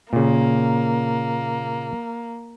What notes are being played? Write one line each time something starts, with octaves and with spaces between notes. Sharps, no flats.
A#2 C#3 A#3